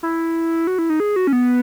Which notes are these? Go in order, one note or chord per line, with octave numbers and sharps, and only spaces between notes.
E4
F#4
E4
D#4
G#4
F#4
C#4
B3